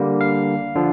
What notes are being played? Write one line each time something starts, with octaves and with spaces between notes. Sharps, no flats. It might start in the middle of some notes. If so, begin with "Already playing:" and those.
Already playing: D3 G3 A#3
F5
D3 F3